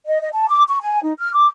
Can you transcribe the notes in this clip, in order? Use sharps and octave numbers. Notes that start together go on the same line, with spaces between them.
D#5
D#5
A5
D6
C#6
G#5
D#4
F6
D6